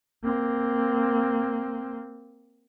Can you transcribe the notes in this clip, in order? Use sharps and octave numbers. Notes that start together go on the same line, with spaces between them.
A#3 C4